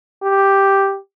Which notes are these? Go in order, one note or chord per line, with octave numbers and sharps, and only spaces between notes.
G4